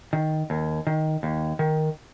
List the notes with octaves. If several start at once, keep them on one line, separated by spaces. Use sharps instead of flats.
D#3
D#2
D#3
D#2
D#3